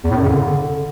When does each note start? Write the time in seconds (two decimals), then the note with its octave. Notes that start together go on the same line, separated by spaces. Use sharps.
0.04 E2
0.10 A2
0.17 F#2
0.23 C#3
0.29 D3